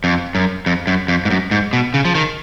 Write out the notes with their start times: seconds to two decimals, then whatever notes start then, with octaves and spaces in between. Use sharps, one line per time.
0.04 F2
0.35 F#2
0.66 F2
0.87 F#2
1.08 F2
1.25 G#2
1.30 F#2
1.51 G#2
1.73 B2
1.94 C#3
2.05 F3
2.15 D#3